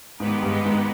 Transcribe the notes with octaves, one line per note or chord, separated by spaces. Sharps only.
G#2 D#3 G#3 B3 G4 B4
G2
G#2